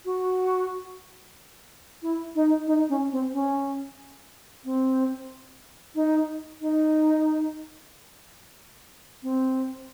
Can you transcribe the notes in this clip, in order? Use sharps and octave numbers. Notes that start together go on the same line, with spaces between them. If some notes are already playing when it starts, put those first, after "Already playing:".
F#4
E4
D#4
D#4
C#4
C4
C#4
C4
D#4
D#4
C4